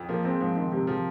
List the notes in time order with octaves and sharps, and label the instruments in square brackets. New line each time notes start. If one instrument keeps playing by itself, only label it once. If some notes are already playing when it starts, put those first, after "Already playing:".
Already playing: [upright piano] F2
[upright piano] F3 [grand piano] A#3
[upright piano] G#3 [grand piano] C4
[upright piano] G#2 [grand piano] F3
[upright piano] G#2 [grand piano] D#3
[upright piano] G#2 [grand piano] C3
[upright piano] F3